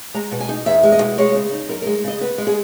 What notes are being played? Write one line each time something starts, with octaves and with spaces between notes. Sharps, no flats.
G#3 A#5
B2
G#5
D#4
E2 E5
G#3
D#5
B2
G#3 C#5
C#3
D#4
F#2 A#4
A#4
G#3
C#3 D#5
B3 B4
G#3
G#4